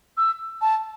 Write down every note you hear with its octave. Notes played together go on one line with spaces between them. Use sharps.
E6
A5